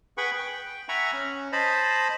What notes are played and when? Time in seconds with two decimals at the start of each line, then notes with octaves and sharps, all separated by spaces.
0.17 G#4 B4 F#5 G5 B5 C#6
0.38 G5
0.89 E5 F#5 G#5 A#5 B5 C#6
1.13 C#4
1.52 C5 D#5 A5 B5